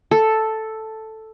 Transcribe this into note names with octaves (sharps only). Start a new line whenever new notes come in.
A4